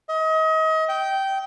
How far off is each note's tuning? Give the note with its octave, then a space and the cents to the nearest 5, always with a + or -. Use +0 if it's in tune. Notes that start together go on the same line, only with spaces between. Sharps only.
D#5 +35
G5 -15